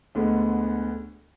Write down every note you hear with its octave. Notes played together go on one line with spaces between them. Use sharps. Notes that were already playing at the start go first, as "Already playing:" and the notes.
D2 D3 G#3 B3